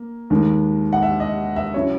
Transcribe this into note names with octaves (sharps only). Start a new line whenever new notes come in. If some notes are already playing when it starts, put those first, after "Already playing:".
Already playing: A#3
D#2 D#3 G#3 D#4
F#5
E5
D#5
E5
C#3 F#3 C#4 E4 C#5